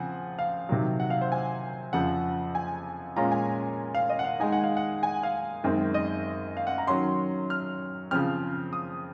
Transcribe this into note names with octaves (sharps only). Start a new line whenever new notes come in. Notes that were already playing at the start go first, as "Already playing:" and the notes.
Already playing: C#3 F3 C4 F#5 G#5
F5
C3 D#3 F#3
F#5
F5
C5
G#5
F2 C#3 F3 F#5
G#5
A#2 G#3 C#4 F4 A#5
G#5
F5
D#5
F#5
F5
D#3 G#3 D#4 G#5
F#5
F5
F#5
G#5
F5
F#2 D#3 G#3 C4
D#5
F5
F#5
A#5
D#3 F#3 C#4 C6
F6
C#3 F3 C4 F6
D#6